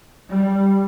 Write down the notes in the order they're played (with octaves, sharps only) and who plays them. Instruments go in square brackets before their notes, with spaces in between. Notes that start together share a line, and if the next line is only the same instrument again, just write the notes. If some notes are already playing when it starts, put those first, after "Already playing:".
[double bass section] G3